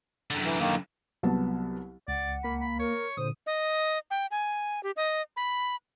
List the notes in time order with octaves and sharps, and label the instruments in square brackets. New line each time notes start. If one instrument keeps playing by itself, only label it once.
[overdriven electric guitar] F#2 D3
[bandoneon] E3
D#3 A#3
[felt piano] C2 F#3 B3 A5
[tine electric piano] C#2 [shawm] D5 [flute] F#5
[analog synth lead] A#3 [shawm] B5
[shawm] B5
[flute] A#4 [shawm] C#5
[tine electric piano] A#2 D3 [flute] C5 [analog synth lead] D#6
[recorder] D#5
G5
G#5
G4
D#5
B5